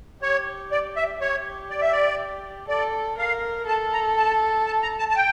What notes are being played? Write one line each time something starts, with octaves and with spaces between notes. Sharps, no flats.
G4 C#5
D5
E5
G4 C#5
D5
E5
D5
A4 D5
A#4 F5
A4 A5
A#5
A5
A5
A#5
A5
A5
G5